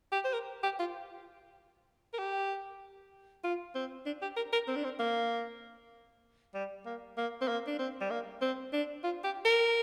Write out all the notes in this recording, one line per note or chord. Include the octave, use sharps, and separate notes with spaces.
G4
C5
A#4
G4
F4
A#4
G4
F4
C4
D4
G4
A#4
A#4
C4
D4
C4
A#3
G3
A#3
A#3
C4
A#3
D4
C4
G3
A#3
C4
D4
F4
G4
A#4